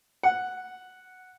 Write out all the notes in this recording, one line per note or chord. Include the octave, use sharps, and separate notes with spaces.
F#5